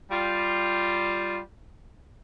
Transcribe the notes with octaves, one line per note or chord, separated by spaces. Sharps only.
G3 F4